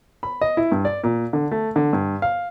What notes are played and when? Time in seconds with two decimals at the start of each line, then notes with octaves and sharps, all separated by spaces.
0.23 B5
0.41 D#5
0.57 E4
0.72 G2
0.85 D5
1.04 A#2
1.33 D3
1.51 A3
1.76 D3
1.93 G2
2.22 F5